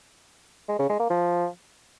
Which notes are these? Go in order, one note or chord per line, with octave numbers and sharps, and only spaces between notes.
G#3
C#3
G#3
A#3
F3